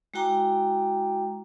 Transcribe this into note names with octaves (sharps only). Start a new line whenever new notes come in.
G#3 E4 F#4 G5 A#5 D6